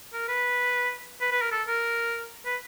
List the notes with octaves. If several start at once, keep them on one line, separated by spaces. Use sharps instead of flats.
A#4
B4
B4
B4
A#4
A4
A#4
B4